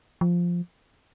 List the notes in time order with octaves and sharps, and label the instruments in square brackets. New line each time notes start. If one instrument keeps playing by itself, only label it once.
[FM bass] F3